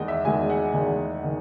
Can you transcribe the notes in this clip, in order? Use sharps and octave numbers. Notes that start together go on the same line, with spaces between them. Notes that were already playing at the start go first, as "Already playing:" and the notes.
Already playing: E2 D#3 G#3 D#5
E5
E2 D#3 G#3 G#5
F#5
E2 D#3 G#3
D#3